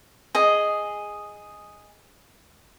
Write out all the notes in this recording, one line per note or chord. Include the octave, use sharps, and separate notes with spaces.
G#4 D#5